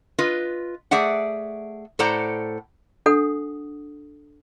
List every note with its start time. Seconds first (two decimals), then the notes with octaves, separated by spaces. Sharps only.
0.18 F4 B4 D#5
0.91 A3 G#4 D5 E5 F#5
1.99 A2 A4 C5 D5 F#5 A#5
3.06 D4 A4 F#5 D#6